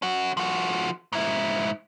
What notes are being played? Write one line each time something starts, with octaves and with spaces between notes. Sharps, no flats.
C#4 F#4
F3 F#4
G#2 E4